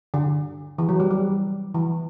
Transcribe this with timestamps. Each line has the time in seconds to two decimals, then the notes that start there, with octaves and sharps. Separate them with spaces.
0.14 D3
0.79 E3
0.89 F#3
1.00 G3
1.11 G3
1.74 E3